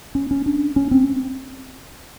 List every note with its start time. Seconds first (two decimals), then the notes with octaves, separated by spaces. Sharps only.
0.15 C#4
0.31 C#4
0.46 D4
0.76 C#4
0.91 C4